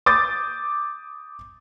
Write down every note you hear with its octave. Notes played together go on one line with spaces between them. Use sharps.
D6 D#6 G6 A6